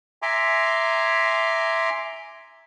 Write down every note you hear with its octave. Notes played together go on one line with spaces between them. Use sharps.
E5 G#5 A#5 C6 D6